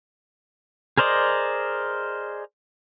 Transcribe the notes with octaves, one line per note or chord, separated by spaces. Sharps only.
G#4 A#4 C5 D5 D#5